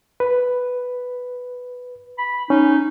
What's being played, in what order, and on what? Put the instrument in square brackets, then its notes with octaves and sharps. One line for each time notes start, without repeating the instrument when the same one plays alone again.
[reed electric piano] B4
[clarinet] B5
[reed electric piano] C#4 [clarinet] D#4